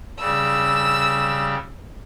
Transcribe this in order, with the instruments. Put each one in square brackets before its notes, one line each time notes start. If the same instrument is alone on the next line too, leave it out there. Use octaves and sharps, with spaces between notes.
[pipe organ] C#3 G3 [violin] E6